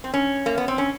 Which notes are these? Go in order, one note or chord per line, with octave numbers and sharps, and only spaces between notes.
C4
C#4
A#3
B3
C4
C#4